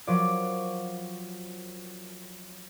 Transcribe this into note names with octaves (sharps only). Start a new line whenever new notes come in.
F3 F#3 A#4 D5